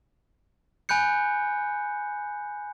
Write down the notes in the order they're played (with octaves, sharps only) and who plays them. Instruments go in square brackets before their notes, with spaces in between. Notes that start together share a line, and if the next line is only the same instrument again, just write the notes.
[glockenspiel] G#5 B5 F#6 G6 C#7